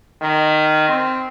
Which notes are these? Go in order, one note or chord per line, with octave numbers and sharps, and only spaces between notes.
D#3
C4